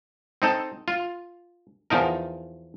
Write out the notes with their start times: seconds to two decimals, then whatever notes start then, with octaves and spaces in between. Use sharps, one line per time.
0.42 C4 D#4 A4
0.88 F4
1.90 E2 F3 D#4 A#4